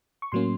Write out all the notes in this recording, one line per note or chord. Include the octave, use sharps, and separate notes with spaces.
C#6
A2 F#3 A#3 C#4 C6